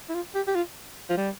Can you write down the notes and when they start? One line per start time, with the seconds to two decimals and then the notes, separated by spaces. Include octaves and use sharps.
0.09 E4
0.14 F4
0.35 G4
0.47 G4
0.55 F4
1.10 F3
1.17 G3